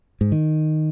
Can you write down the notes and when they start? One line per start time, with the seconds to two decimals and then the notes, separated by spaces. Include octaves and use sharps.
0.21 G#2
0.32 D#3